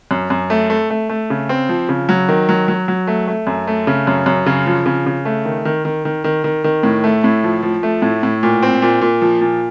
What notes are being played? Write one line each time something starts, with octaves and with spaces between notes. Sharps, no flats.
F#2
F#2
A3
A3
A3
A3
C#3
C4
F3
C#3
F#3
D#3
F#3
F#3
F#3
A3
A3
F#2
A3
C#3
F#2
F#2
C#3
F3
C#3
C#3
A3
D#3
D#3
D#3
D#3
D#3
D#3
D#3
A2
A3
A2
F3
F3
A3
A2
A2
A#2
C4
A#2
A#2
F3
A#2